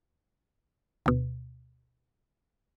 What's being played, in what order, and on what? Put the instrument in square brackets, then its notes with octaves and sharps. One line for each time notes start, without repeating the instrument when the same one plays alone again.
[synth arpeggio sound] D2 B2